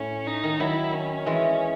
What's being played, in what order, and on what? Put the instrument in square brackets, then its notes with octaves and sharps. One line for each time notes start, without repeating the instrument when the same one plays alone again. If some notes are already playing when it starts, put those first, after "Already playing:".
Already playing: [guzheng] A2 [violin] C#4
[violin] D#4
[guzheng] D#3
[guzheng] D#3 F#3 [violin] E4
[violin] C#4
[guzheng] E3 G#3